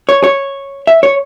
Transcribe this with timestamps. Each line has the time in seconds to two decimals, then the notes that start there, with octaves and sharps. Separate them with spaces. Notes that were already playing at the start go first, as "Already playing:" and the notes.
0.09 C#5
0.24 C#5
0.87 E5
1.03 C#5